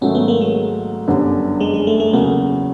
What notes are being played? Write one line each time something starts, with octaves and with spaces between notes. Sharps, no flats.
G#2 D#3 F#3 A3 C#4
B3
A#3
G#3
G1 F#2 D3 G3
G#3
G#3
A3
A3
E2 C#3 F#3 A#3